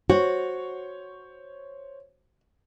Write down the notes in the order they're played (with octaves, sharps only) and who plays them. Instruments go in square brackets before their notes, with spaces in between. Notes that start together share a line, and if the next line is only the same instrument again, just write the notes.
[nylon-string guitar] F#4 [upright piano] C5 C#5